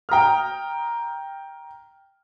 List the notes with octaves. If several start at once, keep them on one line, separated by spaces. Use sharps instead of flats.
G5 A#5 D#6 F6